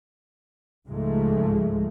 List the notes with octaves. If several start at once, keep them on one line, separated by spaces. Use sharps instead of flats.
C#2 G#2 F3 G#3 A3